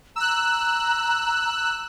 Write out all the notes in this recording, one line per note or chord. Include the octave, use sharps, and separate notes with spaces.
A#5 E6 F#6